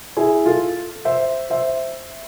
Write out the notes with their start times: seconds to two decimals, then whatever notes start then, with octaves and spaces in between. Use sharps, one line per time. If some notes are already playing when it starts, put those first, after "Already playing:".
0.17 E4 G#4
0.46 F4 A4
1.05 C5 E5
1.50 C5 E5